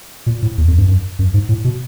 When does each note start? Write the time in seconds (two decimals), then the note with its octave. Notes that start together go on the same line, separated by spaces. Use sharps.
0.26 A#2
0.42 A2
0.58 E2
0.68 F2
0.78 G2
0.88 F#2
1.19 F#2
1.34 G#2
1.49 A2
1.64 B2